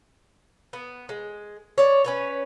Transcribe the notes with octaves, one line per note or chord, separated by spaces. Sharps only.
B3
G#3
C#5 D5
C#4 B4 C#5